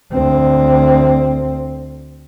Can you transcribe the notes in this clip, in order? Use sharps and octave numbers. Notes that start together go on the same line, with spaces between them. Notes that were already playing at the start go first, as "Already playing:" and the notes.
D2 C4